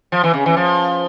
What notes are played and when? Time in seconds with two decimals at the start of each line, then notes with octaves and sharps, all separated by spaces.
0.12 F3
0.23 E3
0.34 C#3
0.46 E3
0.57 F3